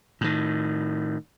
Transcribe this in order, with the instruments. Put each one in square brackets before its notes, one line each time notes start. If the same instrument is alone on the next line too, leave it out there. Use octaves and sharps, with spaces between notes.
[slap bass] A2 D#3